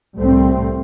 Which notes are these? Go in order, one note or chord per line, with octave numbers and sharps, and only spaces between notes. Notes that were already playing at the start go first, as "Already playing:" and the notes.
C2 A2 G3 A3 C4